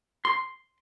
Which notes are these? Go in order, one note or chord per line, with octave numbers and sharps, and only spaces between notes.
C6